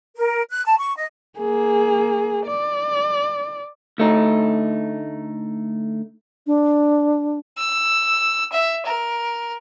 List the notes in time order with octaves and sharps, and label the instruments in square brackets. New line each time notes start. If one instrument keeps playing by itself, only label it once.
[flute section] A#4
F#6
A5
C#6
D#5
[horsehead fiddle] A#3 G#4
D5
[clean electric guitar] D2 A3 D#4
[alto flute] D4
[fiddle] E6
E5
A#4